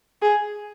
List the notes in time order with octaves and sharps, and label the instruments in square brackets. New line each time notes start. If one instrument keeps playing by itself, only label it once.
[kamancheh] G#4